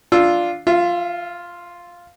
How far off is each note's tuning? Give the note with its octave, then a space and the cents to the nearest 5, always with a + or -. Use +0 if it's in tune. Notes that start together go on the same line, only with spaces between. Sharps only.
D4 +0 F4 +0 E6 +0
F4 +0 E5 +40